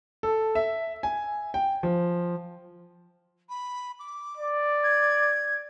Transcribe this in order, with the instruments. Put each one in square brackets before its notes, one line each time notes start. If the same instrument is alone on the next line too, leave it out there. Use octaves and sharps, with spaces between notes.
[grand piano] A4
E5
G#5
G5
F3
[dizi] B5
D6
[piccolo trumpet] D5
[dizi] G#6